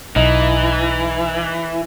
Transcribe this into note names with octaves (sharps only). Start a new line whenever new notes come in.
B1 E3 D#4